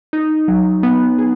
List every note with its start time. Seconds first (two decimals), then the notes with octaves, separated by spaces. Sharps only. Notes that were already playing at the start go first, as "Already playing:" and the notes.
0.13 D#4
0.48 F#3
0.83 B3
1.18 G#4